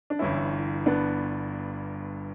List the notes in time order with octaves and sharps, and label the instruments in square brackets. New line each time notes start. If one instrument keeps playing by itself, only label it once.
[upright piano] D4
[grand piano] G1 G2 E3 [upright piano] C#4 E4
[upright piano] B3 D4